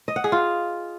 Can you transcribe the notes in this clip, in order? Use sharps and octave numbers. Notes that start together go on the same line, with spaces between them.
D#5
F#5
G#4
F4